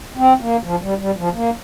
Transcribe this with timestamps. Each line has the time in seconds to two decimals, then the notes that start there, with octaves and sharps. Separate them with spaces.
0.17 C4
0.40 A#3
0.63 F3
0.82 G3
0.99 G3
1.17 F3
1.34 A#3